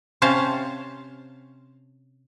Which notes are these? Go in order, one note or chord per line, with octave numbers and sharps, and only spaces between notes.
C3 C#4 C5 F5 A5